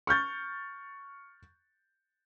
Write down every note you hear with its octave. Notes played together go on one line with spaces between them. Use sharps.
C#6 F6 G6 A6